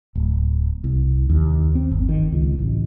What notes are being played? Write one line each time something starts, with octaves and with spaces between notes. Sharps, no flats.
D1
C2
D#2
C4
G1
D#3
C#2
A1